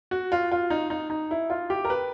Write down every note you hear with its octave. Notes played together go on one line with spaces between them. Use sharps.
F#4
F4
F4
D#4
D#4
D#4
E4
F4
G4
A#4
B4